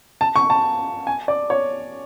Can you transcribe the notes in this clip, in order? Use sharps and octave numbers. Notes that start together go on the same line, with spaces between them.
A5
C#6
A5
G#5
D5
C#5